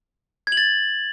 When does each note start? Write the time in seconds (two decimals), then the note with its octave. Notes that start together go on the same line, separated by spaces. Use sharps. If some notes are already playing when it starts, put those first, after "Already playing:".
0.47 G#6
0.52 F#7
0.57 A6